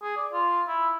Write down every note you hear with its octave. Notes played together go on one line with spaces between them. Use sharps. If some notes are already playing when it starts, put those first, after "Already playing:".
G#4
D5
F4
E4